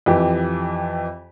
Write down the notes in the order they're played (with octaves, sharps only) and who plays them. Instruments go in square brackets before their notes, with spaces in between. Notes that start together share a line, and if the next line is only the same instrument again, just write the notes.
[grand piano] F2 E3 G4